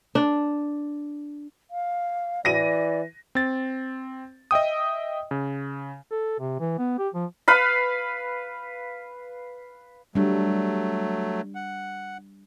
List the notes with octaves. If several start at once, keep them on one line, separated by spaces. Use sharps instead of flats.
D4
F5
E3 D5 A#6 D#7
C4 A6
D#5 E5 G5 D#6
C#3
A4
C3
E3
B3
G4
F3
B4 F5 B5
F#3 G3 A3 D4
F#5